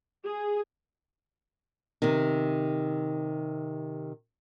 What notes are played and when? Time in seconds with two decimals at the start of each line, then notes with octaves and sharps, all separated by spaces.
0.25 G#4
2.02 C3 D#3